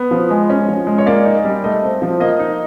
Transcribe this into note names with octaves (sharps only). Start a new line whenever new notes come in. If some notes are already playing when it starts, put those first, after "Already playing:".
Already playing: B3
F3
G#3
C#4
F3
G#3
C#5
A#3 D5
D#4
G3
A3 D#5
C4
F3
A#3 D#5
D#4